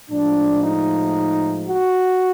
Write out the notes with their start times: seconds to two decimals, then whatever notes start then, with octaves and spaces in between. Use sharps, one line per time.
0.10 A2 F3 G#3 D4
0.63 D#4
1.67 F#4